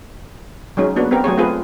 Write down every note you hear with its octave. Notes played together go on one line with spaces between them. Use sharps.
F#3 G#3 C#4 D#4
A#3 B3 D4 F#4
B3 C4 G4 A#4
F#3 A3 G#4 C#5
A3 C4 F4 G#4 B4